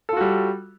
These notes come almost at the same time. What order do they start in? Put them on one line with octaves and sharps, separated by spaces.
A4 F4 F#4 G3